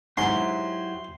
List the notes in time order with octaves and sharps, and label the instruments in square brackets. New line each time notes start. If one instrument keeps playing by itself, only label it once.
[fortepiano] G#2 [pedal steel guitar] F#3 E4 G4 [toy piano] F#5 G#5 [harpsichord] C6